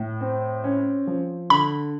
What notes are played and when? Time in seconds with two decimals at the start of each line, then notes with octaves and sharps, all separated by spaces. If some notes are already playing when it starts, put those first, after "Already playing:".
Already playing: A2
0.21 C4
0.64 C#4
1.07 F3
1.50 D3 B5